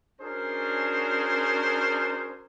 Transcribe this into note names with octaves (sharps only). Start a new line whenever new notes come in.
C#4 D4 F#4 G#4 A#4 C5